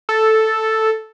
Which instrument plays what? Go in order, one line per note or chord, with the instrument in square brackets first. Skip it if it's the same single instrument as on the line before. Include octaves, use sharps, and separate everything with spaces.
[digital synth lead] A4